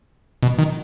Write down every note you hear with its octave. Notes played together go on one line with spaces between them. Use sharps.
B2
D#3